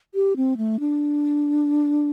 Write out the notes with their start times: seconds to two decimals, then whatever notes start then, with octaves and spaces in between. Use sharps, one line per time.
0.15 G4
0.36 C4
0.57 A3
0.80 D4